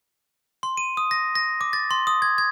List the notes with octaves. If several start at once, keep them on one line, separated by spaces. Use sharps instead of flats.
C6
D#7
D#6
A#6
A#6
D6
A6
C6
D#6
G#6
G#6